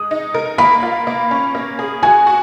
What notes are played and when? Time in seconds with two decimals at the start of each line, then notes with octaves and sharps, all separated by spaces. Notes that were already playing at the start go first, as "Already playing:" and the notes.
Already playing: G#3 D#6
0.11 D#4
0.34 A#4
0.58 A#3 B5
0.83 F4
1.07 A#3
1.31 C#4
1.55 A#3
1.79 G#4
2.03 F#4 G#5
2.27 F#4